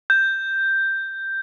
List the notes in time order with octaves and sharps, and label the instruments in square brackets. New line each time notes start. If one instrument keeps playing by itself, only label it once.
[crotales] G6